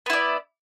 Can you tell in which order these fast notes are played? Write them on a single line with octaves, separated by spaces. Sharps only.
B3 E4 D5